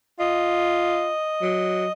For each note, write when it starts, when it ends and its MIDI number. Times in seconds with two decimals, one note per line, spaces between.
0.20 1.11 65
0.20 1.92 75
1.41 1.87 54